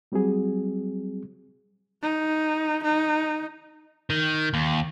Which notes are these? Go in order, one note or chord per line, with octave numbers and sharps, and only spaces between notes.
F#3 G3 C4 F#4 G#4
D#4
D#4
D#3
D#2